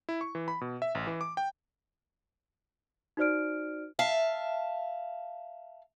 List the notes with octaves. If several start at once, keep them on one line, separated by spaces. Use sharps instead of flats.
E4
C#6
E3
B5
B2
E5
A1
E3
D6
G5
D#4 F#4 C5 D5 F6 D7
E5 F5 A5